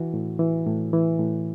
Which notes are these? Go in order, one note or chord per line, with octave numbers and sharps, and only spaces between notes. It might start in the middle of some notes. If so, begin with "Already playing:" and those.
Already playing: E3 F#4
A2
E3
A2
E3
A2